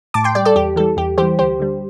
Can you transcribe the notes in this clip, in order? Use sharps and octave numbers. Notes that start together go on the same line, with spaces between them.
A2 A5 D6
G5 C6
G3 D5 G5
A4 D5
E2 G4
E3 G3 A4
E2 G4
E3 G3 G4 C5
D2 G4 C5
D3 G3